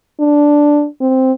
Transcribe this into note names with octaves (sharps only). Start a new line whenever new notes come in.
D4
C4